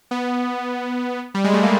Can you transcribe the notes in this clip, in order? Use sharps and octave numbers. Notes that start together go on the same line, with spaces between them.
B3
G3
G#3
A3
A#3